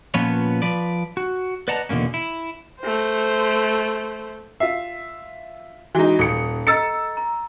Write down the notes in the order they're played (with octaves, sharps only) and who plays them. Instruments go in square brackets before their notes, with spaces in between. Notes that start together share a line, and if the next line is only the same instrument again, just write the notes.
[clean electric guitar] A#2 F3 B3 C#4 B4 C#5
F3 B4 D5
F#4
B4 D5 D#5 F#5 A5 A#5
E2 B2 D3 A#3 C#4
E4
[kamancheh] A3 C5
[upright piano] F4 E5 [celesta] C7
[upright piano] E3 G#3 D#4 [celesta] F#4
[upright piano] D#1 C#7 [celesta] D#6
[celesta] A4 D#5 A#5 [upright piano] E6 A6 C#7
[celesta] A#5